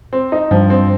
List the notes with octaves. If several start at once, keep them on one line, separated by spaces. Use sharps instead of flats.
C4
D#4
G2 F3
C4